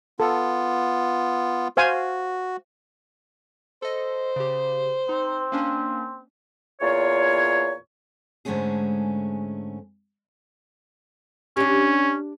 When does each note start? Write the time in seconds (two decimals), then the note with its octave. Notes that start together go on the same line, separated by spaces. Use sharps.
0.20 B3 F4 A4
1.77 F#4 C5 F5 G#5
3.82 A4 C5 D#5
4.36 C#3 G4
5.09 C4 D#4
5.52 A#3 C#4 D4
6.81 E2 A#2 F4 C#5
8.45 G#2 D3 G#3 A3 C#4 G#4
11.57 C#4 D4 G4